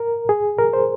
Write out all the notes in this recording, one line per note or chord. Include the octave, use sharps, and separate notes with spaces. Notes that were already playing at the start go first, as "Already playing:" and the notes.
Already playing: A#4
G#4
A#4
C5